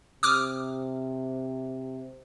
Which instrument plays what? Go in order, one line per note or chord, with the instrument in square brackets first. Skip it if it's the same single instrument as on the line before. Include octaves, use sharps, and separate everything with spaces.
[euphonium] C3 [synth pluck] D6 D#6 F6